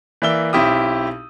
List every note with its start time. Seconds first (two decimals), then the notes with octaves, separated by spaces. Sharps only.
0.22 E3 A#3 D5 E5 E6 G7
0.53 B1 C4 E4 G4 D#6